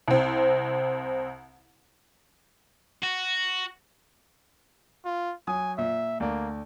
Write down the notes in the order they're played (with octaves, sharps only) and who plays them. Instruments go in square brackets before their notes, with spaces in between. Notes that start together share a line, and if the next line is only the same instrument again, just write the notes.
[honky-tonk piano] C2 C4
[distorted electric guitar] F#4
[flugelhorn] F4
[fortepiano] F#3 D#6 [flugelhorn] G#5
[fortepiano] A#2 [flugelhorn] E5
[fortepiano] D2 D5 [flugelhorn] A#3